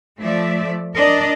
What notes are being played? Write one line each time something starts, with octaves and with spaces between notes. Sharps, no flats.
F3 A3 D5 E5
D4 A#4 D5 D#5